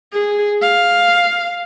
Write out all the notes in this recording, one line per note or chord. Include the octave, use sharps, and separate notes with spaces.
G#4
F5